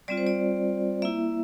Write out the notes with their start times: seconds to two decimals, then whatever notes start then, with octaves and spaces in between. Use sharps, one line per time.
0.08 G3 C4 F4 D5
0.17 C5
0.27 D5
1.02 A#3 E4 E5